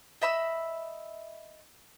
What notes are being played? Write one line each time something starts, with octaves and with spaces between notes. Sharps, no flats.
D#5 E5 B5 E6